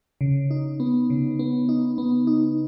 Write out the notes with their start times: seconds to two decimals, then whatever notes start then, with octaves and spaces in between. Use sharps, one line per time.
0.21 C#3
0.51 D#4
0.80 B3
1.10 C#3
1.39 B3
1.69 D#4
1.98 B3
2.27 D#4